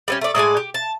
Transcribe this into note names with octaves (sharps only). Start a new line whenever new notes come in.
G3 B3 C#4
A3 D5
A2 G#3 D5 G#5
G4
A5